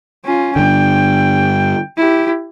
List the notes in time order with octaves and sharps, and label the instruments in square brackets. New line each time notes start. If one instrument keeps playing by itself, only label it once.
[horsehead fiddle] C#4 F4
[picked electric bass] G2 D3 [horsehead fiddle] G5
[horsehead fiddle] E4 G4